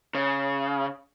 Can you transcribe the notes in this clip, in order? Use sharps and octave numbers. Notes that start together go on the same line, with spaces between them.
C#3